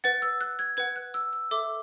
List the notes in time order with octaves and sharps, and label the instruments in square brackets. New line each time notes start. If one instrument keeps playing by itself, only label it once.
[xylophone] B4 F#5 A6
E6
F#6
G#6
B4 F#5 G#6
F#6
E6
E6
A4 E5 D6